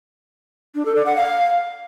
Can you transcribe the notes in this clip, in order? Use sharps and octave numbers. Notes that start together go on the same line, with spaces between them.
D4
A4
D5
F#5
F5